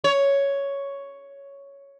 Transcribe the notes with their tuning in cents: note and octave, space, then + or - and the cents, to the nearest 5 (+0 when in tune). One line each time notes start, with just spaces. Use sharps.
C#5 +5